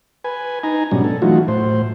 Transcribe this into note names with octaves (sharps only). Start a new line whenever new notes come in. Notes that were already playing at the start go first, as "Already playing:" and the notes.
B4 G#5
D#4 G#5 A#5
G#2 B2 F#3 G3 C#4 D4
A4
E3 F#3 A3 D#4 F4 F#4
A2 C5